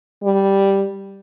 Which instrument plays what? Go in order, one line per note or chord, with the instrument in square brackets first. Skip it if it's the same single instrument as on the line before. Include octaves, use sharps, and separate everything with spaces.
[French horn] G3